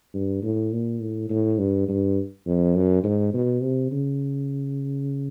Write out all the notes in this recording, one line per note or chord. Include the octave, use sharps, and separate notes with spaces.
G2
A2
A#2
A2
A2
G2
G2
F2
F#2
G#2
B2
C3
C#3